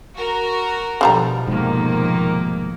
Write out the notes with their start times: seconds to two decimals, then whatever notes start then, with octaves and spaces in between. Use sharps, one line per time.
0.15 F#4 A#4
1.01 B2 D3 F3 G3 A#5
1.47 F1 G#2 D#3 A#3